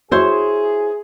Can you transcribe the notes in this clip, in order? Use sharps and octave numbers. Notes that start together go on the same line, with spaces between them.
E4 F#4 G#4 C5 C#5 E5